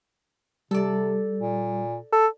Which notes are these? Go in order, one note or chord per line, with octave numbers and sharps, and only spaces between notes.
C3 G3 A4 D5
A#2
A4